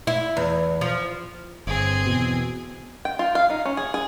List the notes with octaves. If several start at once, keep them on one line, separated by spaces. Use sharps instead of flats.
E4
E2
F3
G1 C4 G#4
E2 B2
G5
F4
F5
D#4
C#4
G#4
G#4